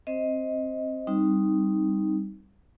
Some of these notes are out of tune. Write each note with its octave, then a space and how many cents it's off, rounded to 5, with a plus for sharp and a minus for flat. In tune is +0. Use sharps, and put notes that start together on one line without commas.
C4 +15 C5 +0 D#5 +10
G3 +0 C4 +5 D#4 +0